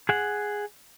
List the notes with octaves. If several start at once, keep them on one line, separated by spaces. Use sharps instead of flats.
G#4 F#5